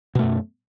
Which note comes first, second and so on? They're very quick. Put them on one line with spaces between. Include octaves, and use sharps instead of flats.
B2 A3 F#2